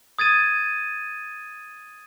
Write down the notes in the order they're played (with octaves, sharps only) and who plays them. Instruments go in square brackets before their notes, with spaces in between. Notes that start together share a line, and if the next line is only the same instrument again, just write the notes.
[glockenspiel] D#6 G#6 A6 D#7